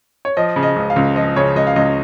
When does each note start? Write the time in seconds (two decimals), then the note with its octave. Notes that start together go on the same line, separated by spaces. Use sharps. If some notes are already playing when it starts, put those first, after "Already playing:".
0.25 C#5
0.37 F3 D#5
0.56 C#3
0.63 D#5
0.76 C#2
0.90 F5
0.96 C#2
1.16 F3 D#5
1.36 C#3 C#5
1.55 C#2 D#5
1.67 F5
1.76 C#2 D#5